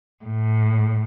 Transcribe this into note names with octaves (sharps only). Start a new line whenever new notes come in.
A2